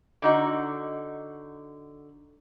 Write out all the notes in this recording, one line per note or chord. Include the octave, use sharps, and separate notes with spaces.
D3 D#4 F#4